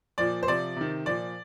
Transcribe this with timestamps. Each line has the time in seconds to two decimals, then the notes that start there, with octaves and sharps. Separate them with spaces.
0.18 A#2 F3 D5
0.43 C5
0.48 C3 F3 D5
0.76 C3 D#3
1.06 A#2 F3 D5